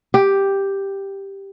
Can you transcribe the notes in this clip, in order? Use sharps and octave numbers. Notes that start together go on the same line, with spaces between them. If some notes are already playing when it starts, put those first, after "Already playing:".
G4